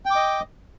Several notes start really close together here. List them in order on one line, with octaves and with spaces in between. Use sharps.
G5 D6 D#5